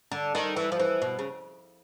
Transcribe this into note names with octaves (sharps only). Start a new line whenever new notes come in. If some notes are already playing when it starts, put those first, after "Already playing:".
D3
D#3
E3
F3
E3
B2
C#3